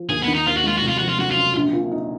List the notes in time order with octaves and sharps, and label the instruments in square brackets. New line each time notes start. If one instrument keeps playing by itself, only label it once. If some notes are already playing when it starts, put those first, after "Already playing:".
Already playing: [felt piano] F3
[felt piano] D#2 [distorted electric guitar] G#4
[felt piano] D#3 [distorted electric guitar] B3
[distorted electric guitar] D#4
[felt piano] D#2 [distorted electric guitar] F4
[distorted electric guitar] F#4
[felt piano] G#3 [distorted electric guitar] F4
[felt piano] F1 [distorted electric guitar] F#4
[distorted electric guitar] F4
[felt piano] F2 [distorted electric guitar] F#4
[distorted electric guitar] F4
[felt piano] F#3 [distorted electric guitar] F#4
[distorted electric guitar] F4
[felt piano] C#3
A#1
A#2
D#4